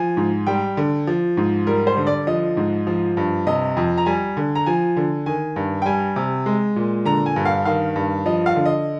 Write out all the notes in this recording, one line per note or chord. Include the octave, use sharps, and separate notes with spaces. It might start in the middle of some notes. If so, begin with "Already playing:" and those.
Already playing: F3 G#5
G#2
G3 G5
D3
F3
G#2
G3 A#4
C5
D3
D5
F3 D#5
G#2
F3
G2
C3 D#5
F2
A#5
G3 G#5
D3
A#5
F3 G#5
D3
D#3 G#5
G2
G5
G3 G#5
C3
G#3
A#2
D3 A#5
G#5
G2
F5
D#3 F5
G2
F3 D#5
F5
D3
D#5